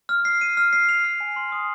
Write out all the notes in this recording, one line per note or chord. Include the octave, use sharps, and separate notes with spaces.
F6
C7
D#7
F6
C7
F7
F6
G#5
C6
D#6